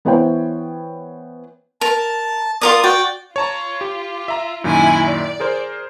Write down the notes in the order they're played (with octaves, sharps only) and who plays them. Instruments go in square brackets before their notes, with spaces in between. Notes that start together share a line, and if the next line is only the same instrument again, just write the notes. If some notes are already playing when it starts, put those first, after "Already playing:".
[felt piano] E3 B3 C5 C#5 G5
[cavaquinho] A#4 [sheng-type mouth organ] A5
[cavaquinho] F4 A#4 D5 [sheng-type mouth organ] D#6
[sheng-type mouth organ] F#4 G5 [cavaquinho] D5
[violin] F4 [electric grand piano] C#5 A5 A#5
[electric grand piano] G4
E5 A#5
[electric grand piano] F#2 A#2 D#3 [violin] E4 G#5
[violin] D5
[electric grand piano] G#4 A#4 C5